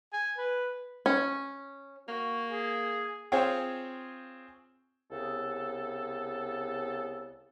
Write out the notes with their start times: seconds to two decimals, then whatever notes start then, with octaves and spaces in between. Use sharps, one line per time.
0.13 G#5
0.37 B4
1.06 C#4
2.08 A#3 F#4
2.51 G#4
3.32 C4 F4 G#4 C5 C#5
5.11 C2 C#3 B3 A4